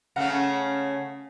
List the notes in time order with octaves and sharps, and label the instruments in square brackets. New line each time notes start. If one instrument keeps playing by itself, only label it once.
[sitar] C#3 A3 C#4 [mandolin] F5 F#5 A#5